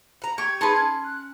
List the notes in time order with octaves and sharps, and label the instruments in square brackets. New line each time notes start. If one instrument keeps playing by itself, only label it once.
[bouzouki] F#5 A#5
[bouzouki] G4 [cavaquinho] C#6 [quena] G#6
[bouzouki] D#4 G#4 B4 [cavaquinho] A5 C6
[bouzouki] C#4
[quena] F#6